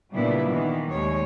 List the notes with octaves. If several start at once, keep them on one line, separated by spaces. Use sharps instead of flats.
A#2 C#3 G3 B3 D4 E4
D#3 E3 B3
D#2 G3 G#3 C#5